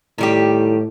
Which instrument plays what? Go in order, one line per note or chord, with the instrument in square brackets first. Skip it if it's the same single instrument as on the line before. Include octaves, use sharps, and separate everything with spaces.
[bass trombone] A2 [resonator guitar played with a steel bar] D#3 G3 G4